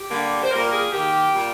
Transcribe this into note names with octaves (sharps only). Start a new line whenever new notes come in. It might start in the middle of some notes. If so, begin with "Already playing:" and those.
Already playing: G4
D3 G3 A#3
C5
A#2 G3 A#3 A#4
G#4
D#3 A#3 G4
A#2 G3 A#3